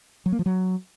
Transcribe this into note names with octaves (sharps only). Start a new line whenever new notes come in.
F#3
A#3
F3
F#3